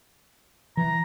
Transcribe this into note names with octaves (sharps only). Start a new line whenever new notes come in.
E3 A#5